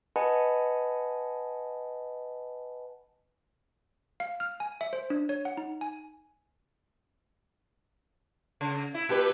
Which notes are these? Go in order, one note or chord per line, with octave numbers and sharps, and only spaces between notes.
B4 D#5 F#5 G#5 A5 B5
F5
F6
G#5
E5
C5
D4
C#5
F#5
D#4
G#5
C#3
E4
A#2 G4 B4